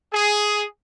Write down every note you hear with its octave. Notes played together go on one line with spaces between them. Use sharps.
G#4